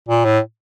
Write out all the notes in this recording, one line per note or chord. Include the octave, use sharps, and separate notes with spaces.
A#2
A2